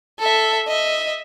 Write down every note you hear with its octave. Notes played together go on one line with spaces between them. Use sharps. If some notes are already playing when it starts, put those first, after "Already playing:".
A4 E5
D#5 E5